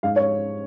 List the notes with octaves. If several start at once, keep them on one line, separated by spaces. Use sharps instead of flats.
G#2 F5
C#5